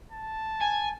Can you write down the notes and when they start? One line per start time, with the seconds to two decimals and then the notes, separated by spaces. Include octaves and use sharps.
0.11 A5
0.61 G#5